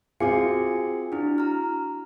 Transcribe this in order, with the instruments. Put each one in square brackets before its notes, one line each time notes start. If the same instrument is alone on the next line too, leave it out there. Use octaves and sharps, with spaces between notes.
[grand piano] C4 F4 G#4 [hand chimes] F#4 D6 C#7
[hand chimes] D4 E4 [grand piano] F#4
[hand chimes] A#5 F6